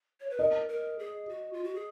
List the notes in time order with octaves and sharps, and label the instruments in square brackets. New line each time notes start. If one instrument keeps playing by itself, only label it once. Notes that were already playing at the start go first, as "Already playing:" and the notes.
[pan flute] C#5
B4
[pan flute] A#4 [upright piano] D#5
[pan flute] A#4
G#4
F#4
F4
F#4
G#4